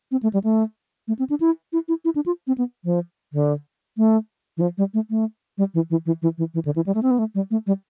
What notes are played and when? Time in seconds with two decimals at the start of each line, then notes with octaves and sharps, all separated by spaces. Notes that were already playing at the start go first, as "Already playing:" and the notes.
0.11 C4
0.23 A3
0.33 G3
0.44 A3
1.08 A3
1.19 C4
1.30 D4
1.40 E4
1.73 E4
1.88 E4
2.05 E4
2.15 D4
2.26 F4
2.47 C4
2.58 B3
2.85 F3
3.33 D3
3.97 A3
4.57 E3
4.61 F3
4.78 G3
4.94 A3
5.10 A3
5.58 G3
5.74 E3
5.90 E3
6.06 E3
6.22 E3
6.38 E3
6.54 E3
6.65 D3
6.76 E3
6.86 G3
6.95 A3
7.03 C4
7.11 B3
7.19 A3
7.35 G3
7.51 A3
7.67 G3